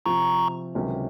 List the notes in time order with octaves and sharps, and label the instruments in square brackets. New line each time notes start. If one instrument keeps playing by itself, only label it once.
[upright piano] C3 F3 C4 F4 [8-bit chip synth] A#5 C#6
[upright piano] C#2 C3 D#3 F#3 C#4